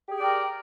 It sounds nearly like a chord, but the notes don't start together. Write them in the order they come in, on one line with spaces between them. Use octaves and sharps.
G4 G#4 G5 D5 A#4